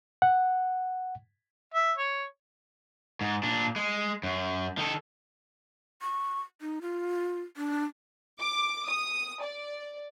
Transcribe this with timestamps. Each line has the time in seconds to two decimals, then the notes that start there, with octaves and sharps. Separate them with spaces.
0.22 F#5
1.74 E5
1.98 C#5
3.21 G#2
3.43 A#2 D4
3.76 G#3
4.23 F#2
4.78 D#3 A4
6.02 C#6
6.61 D#4
6.82 F4
7.57 D4
8.40 D6
8.87 D#6
9.41 D5